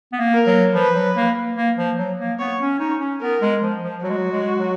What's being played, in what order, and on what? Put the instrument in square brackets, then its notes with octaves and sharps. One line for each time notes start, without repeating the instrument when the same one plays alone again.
[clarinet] B3
A#3
[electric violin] A#4
[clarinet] F#3
[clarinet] F3 [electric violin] B4
[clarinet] F#3
A#3
A#3
F3
F#3
A#3
[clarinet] B3 [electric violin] C#5
[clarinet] C#4
[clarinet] D#4 [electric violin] C#5
[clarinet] C#4
[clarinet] B3 [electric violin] A#4
[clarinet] G#3
F3
F3
[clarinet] F#3 [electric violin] F#4
[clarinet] G#3
F#3
G#3
F#3